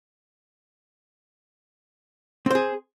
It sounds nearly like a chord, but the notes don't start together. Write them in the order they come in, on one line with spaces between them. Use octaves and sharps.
C4 C5 G#4